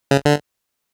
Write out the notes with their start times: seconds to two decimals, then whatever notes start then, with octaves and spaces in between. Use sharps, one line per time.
0.11 C#3
0.25 D3